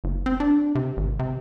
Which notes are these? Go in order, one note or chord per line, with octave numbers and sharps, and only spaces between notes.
F#1
C4
D4
C3
G#1
C3